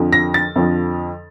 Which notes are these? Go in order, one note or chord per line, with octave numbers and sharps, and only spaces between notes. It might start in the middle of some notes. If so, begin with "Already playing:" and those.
Already playing: F2 D3 F3
A#6
A6
F2 D3 F3